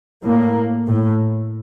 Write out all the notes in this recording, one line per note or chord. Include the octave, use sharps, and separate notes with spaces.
A2 A#3
A2